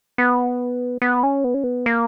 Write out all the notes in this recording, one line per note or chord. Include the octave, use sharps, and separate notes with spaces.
B3
B3
C#4
B3
C#4
B3
A#3